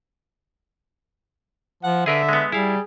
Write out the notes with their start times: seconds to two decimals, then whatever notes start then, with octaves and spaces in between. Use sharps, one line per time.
1.83 F3 F#5
2.06 D3 G#4 A#4 B4 E5
2.29 G#3 B3
2.52 G3 E4 G#4 F5